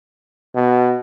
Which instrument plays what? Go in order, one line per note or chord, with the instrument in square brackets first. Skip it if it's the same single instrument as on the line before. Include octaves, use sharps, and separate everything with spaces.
[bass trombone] B2